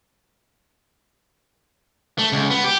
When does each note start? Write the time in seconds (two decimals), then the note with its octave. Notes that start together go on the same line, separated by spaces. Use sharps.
2.18 A3
2.32 C#2
2.50 B3
2.64 G4